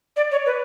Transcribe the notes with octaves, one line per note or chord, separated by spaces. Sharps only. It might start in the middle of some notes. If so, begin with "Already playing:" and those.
D5
C#5
B4